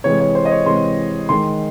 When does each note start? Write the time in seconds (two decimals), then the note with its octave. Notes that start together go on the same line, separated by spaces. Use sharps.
0.04 C3 E3 G#3 C#5
0.20 C#5
0.35 C5
0.45 D#5
0.51 C#5
0.66 C3 E3 G#3 C6
1.29 D#3 G#3 C6